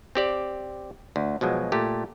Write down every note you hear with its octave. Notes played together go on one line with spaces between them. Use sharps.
C4 G4 D5
D2
B2 F3 F#3 G#3
A#2 A3 G4